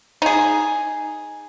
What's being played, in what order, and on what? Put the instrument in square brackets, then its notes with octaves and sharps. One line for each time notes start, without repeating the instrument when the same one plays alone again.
[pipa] D#4 G#4